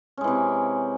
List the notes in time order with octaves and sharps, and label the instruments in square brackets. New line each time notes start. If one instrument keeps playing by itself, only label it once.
[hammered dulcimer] C#4
G#3
E3
C3